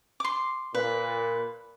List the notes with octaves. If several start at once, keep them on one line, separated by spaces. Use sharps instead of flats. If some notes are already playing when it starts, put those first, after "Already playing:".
C6 D6
A#2 B4